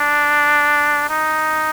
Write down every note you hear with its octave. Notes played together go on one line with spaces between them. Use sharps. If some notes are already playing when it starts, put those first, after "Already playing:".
Already playing: D4
D#4